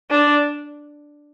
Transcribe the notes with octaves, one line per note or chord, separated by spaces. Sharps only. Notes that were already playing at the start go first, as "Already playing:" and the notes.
D4